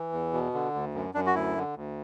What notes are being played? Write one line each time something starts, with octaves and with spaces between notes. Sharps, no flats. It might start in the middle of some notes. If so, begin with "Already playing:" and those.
Already playing: E3
E2
B2
D3
D2
F#2
F#2 D4
F#4
D2 E4
D3
D2